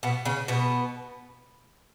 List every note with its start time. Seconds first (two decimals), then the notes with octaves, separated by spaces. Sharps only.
0.03 B2 B3
0.25 C#3 C#4
0.48 B2 B3